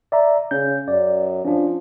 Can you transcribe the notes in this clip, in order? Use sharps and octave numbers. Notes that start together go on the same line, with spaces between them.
D5 E5 A#5
C#3 C#4 G6
F#2 D5
F3 C#4 D4